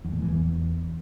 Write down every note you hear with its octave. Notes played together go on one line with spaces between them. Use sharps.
E2
A2
E3
E2